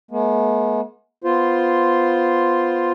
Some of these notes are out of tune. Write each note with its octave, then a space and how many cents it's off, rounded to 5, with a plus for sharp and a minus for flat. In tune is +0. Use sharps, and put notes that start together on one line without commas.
G#3 +45 B3 -45
B3 +0 F4 +0 C5 +0